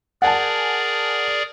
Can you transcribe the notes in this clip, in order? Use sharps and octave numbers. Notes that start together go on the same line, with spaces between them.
G#4 A#4 D5 F#5 G#5 A5